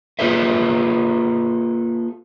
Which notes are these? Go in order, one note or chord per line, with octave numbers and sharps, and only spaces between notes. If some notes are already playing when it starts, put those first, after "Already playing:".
A#3 F4 G#4 A4 B4 E5